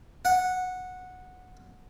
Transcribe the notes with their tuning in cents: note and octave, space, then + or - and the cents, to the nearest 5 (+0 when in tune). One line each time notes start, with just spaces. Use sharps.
F#5 -10